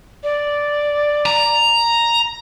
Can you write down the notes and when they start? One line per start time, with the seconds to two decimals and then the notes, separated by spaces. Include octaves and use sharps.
0.23 D5
1.26 A#5